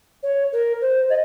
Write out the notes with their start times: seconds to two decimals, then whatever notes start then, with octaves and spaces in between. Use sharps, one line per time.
0.23 C#5
0.52 A#4
0.81 C5
1.09 D#5